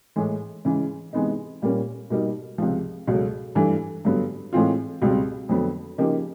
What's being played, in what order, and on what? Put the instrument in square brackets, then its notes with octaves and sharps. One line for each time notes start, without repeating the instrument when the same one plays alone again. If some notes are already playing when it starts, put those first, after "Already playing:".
[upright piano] A2 E3 G#3
C#3 E3 G#3
C3 E3 G#3 B3 D#4
A#2 G3 A#3 C#4
B2 G3 A#3 D#4
C#2 C3 F3
C#2 B2 F#3 A3
G2 E3 A3 D4
G2 D3 F#3 B3
A2 E3 G#3 C4 F4
C#2 B2 G3 C4
F2 D3 F#3 B3
C#3 F3 A#3 D#4 G4